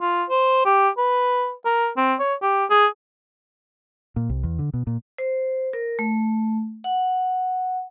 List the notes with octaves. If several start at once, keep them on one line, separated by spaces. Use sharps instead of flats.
F4
C5
G4
B4
A#4
C4
C#5
G4
G#4
A#2
C2
E2
D3
B2
A#2
C5
A#4
A3
F#5